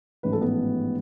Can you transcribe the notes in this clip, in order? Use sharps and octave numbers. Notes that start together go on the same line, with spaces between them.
A1 G#2 F3 B4
A4
B3 B4